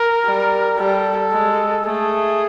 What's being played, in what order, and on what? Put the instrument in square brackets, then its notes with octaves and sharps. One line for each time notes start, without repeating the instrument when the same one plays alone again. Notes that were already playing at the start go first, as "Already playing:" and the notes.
Already playing: [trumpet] A#4
[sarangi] G3
[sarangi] G3 [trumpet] A4
[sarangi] G#3
[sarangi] A3 [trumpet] G#4